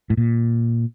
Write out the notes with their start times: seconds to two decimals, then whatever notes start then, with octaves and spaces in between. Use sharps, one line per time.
0.10 A2
0.17 A#2